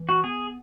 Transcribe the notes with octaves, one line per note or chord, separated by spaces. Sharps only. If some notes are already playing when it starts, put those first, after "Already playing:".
Already playing: E3
F#4
B3 G#4